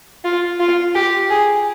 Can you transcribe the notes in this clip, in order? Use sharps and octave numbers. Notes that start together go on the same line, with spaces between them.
F4
F4
G4
G#4